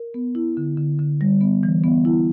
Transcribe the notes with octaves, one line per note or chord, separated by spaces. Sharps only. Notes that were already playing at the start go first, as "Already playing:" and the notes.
Already playing: A#4
B3
E4
D3
D3
D3
G3
B3
E3
B3
E4